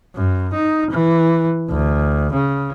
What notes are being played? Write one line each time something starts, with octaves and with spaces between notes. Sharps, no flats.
F#2
D#4
E3
D2
C#3